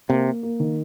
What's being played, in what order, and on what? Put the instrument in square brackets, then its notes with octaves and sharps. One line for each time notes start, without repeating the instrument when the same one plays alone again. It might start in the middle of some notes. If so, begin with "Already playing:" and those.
[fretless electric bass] C3 [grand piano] A#3
[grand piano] A#3
A#3
D#3